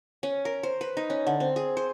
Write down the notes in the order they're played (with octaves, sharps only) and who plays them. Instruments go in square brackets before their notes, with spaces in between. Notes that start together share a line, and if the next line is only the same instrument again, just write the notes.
[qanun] C#4
A#4
C5
B4
D#4
C#4
D3
C4
G#4
C5